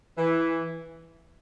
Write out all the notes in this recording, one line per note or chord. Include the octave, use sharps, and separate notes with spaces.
E3